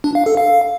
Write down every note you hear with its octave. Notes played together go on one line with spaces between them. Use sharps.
D4
F5
A4
F5